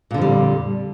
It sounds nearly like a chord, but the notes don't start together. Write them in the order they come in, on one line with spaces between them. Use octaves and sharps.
A#2 D3 F2 G3